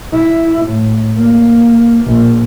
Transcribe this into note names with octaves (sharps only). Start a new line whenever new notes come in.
E4
A2
A#3
A#1